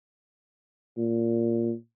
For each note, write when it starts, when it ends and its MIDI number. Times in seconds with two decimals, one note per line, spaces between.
0.97 1.72 46